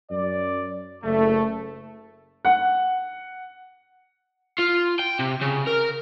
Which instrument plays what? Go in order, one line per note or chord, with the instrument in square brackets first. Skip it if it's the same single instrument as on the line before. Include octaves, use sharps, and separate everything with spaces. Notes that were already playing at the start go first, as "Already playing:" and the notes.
[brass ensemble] F#2 D5
F#1 A3
[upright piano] F#5
[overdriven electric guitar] F4
G5
C3
C#3
A#4